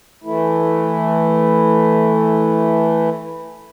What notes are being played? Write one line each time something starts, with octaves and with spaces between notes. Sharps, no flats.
E3 A3 E4